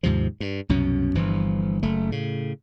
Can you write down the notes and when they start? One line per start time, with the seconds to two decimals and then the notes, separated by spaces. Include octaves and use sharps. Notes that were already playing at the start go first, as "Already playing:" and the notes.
0.03 D#2 G#2 C3 F3
0.40 G2
0.69 C2 F#2 B2 C#4
1.15 G1 G2 E3 F3
1.83 F#1 A3
2.10 A2 C#3